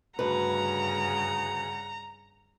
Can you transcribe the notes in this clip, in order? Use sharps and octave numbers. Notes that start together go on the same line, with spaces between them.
D2 G2 C#3 B4 F#5 A#5